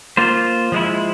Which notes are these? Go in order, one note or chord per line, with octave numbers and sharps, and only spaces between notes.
A#3 F4 C5
F3 G#3 E4